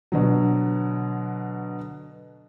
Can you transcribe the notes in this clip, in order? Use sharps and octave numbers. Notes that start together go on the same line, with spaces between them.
B2 D3 F#3